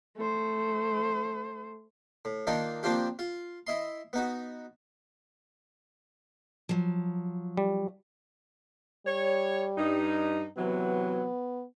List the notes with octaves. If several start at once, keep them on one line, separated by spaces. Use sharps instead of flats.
A3 C5
A2
D#3 A#3 D4 D#4 F4
F3 A#3 C4 D4 F4 G4
F4
E4 D#5 C6
B3 D#4 F#4
F3 F#3
G3
G3 C#5
G2 D#4
C3 E3 F#3 B3